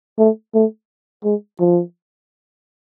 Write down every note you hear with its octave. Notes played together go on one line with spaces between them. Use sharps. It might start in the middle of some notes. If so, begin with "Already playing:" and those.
A3
A3
G#3
F3